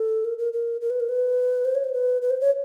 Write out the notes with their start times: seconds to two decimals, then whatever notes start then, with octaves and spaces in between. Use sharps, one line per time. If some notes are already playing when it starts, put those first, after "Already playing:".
Already playing: A4
0.25 A#4
0.38 A#4
0.53 A#4
0.81 A#4
0.90 B4
1.00 A#4
1.09 B4
1.65 C5
1.75 C#5
1.84 C5
1.93 B4
2.22 B4
2.30 C5
2.41 C#5